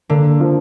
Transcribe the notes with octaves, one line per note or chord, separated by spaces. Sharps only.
D3 A#3
F3